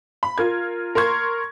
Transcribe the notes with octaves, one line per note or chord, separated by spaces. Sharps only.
B5
F4 A#4 G#6
A#4 C6 C#6 G#6